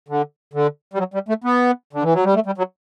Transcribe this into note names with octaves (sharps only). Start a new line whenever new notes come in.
D3
D3
G3
F#3
G3
A3
B3
D3
E3
F#3
G3
A3
G3
F#3